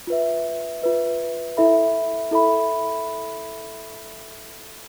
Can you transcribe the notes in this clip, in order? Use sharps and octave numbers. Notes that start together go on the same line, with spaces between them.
F4 B4 E5
F4 B4 E5
E4 A4 E5 B5
E4 A4 E5 B5